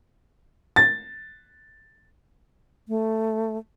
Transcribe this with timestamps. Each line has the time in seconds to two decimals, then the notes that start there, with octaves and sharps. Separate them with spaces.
0.76 A6
2.88 A3